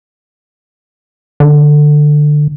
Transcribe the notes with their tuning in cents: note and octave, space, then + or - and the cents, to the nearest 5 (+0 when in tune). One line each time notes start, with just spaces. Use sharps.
D3 +15